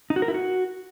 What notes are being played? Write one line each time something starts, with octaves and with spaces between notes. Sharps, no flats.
D#4
F#4
A#4
E4
F#4